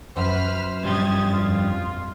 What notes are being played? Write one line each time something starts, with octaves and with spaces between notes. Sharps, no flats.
F#2 B4 C5 B5 F6
G2 F3 G4 D#6 G#6 A6
A#1 F2 F4